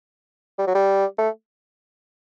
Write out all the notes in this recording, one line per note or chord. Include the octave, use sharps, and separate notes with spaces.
G3
F#3
G3
A3